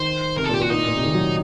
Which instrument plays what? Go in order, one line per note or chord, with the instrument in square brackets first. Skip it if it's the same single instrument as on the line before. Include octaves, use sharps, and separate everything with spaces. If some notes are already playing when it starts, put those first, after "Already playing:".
Already playing: [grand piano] D#3 [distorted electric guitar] C5
[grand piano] C3 [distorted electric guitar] A#4
[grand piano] A#2 [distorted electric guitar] A4
[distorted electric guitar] G4
[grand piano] A#2
[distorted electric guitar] F#4
[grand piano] A#2 [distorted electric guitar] D#4
[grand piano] A2
A#2
C3
D#3
F#3